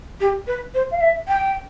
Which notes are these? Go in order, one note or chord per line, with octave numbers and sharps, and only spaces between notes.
G4
B4
C5
F5
E5
G5